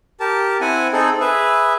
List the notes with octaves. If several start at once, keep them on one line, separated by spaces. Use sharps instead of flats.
G4 A#4 A5
C4 E4 F#5 G#5
C4 D#4 G#4 A4
G#4 B4 E5